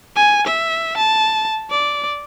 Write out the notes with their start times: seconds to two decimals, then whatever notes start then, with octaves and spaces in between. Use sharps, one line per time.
0.16 G#5
0.47 E5
0.97 A5
1.71 D5